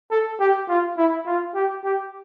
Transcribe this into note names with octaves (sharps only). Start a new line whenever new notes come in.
A4
G4
F4
E4
F4
G4
G4